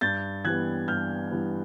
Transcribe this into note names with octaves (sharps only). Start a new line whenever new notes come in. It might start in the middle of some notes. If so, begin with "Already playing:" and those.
G2 G6 A6
E3 G3 B3 F#6 G#6
G2 F6 G6
E3 G3 B3